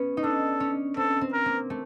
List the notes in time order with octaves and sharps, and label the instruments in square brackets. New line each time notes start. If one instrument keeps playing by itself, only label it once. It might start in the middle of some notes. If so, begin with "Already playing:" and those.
Already playing: [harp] B3 C#4
D#4
[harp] D4 [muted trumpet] A4
[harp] C#4
[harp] C4 [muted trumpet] A4
[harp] C4
[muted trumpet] A#4
[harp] A#3
A3